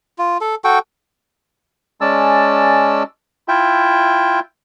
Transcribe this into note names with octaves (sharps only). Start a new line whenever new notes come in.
F4
A4
F#4 A4 G5
G#3 C#4 D5 A5 E6
E4 F4 E5 G5